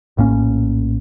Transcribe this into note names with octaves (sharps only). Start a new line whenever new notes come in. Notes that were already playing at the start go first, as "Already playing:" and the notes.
A#1 A2 A#3 C#4